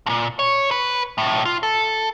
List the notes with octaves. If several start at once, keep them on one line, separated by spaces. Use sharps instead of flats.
G2 A#2
C#5
B4
B1 A2
F4
A4